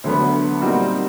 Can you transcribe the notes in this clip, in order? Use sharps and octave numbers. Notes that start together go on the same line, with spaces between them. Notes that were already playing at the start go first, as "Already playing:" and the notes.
D2 D3 F#3 B3
A#2 G3 C4 D#4 F#4